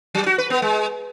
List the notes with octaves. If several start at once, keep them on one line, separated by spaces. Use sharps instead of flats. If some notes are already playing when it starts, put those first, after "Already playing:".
F#3
F#4
B4
B3
G#3